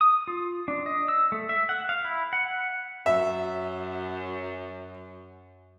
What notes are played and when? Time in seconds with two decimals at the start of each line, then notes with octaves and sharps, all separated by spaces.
0.01 D#6
0.27 F4
0.68 D4
0.86 D#5
1.08 E6
1.32 A3
1.49 E5
1.69 F#5
1.89 F5
2.05 E4
2.33 F#5
3.06 F#2 E5